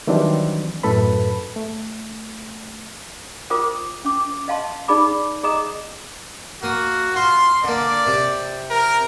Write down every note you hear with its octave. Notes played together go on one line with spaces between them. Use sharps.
D#3 E3 F#3 G3 C4 D4
F#2 A2 A4 B4 B5
A3
F4 A#4 C5 G5 D6 D#6
C#4 D6
D#5 F5 A5 C6
D#4 G#4 D5 B5 D6
G#4 D#5 A#5 D#6
A#3 F#4 D#6
F4 C6
D3 A#3 D5
C3
A#4